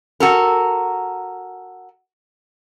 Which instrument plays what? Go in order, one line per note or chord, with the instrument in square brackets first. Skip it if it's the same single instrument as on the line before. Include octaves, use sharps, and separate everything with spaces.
[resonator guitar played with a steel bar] F#4 A4 A#4